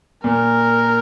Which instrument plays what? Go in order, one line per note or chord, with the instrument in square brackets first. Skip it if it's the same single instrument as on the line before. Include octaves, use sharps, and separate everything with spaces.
[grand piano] A#2 [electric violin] A#4